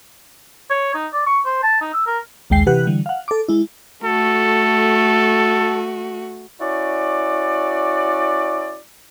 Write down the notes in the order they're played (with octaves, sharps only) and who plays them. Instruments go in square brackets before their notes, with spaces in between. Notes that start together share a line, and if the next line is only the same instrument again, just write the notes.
[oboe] C#5
D#4
D5
C#6
C5
A5
D#4
E6
A#4
[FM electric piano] A#1 D#2 G#3 G5 C7
C3 E3 G4 B4 F#5 F#6
D3 E3 G3
F5 F#5
A4 D6
G#3 E4
[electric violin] A3 F#4 [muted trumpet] A4
[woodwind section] C#4 E4 F#4 D5